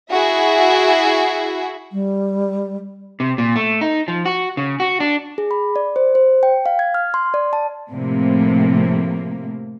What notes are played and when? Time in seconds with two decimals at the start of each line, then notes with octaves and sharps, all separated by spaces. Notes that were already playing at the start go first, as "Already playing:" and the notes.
0.12 E4 F#4 G#4 E5
1.92 G3
3.20 C3
3.38 A#2
3.56 A3
3.81 D#4
4.08 F3
4.26 F#4
4.57 C#3
4.80 F#4
5.00 D4
5.38 G#4
5.51 B5
5.76 D5
5.96 C5
6.15 C5
6.43 G5
6.66 F5
6.79 G#6
6.94 F6
7.14 C6
7.34 D5
7.53 A5
7.92 A2 C3 F3 A#3